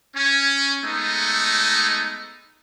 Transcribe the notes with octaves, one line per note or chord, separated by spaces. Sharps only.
C#4
G#3 A3 B3 D#4